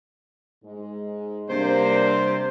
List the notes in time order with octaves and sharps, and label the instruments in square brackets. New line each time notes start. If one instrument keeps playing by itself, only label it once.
[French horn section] G#2 G#3
[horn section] C3 G3 C5 [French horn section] A#3 D4